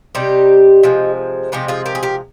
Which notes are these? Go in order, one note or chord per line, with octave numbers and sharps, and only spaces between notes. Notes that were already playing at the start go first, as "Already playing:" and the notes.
C3 G3 D#4 G4
C3 F3 G#3
C3 F3 G#3 D#4 G4
F4 G#4
G4 A#4
G#4
G4 A#4